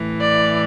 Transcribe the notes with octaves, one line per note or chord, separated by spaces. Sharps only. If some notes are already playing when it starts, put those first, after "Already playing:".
Already playing: A2 E3
D5